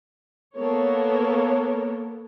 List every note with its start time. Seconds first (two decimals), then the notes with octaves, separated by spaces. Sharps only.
0.55 A#3 B3 A4 A#4 C#5